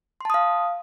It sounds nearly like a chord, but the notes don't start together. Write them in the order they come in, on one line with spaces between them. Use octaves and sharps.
C6 A5 D#6 F5